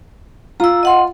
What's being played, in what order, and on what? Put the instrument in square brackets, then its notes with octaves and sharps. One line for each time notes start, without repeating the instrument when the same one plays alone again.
[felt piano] F4 [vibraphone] A#5 E6
[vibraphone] D#5 F#5 C6